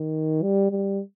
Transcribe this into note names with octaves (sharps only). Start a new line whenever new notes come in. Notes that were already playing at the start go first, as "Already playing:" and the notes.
Already playing: D#3
G3
G3